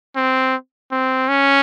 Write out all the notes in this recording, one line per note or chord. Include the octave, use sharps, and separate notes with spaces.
C4
C4
C#4